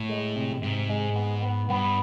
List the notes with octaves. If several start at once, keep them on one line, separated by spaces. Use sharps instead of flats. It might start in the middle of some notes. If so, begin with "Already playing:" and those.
Already playing: A2
G#3
C3
G#2 C3
G#3
B3
B3
G2 B3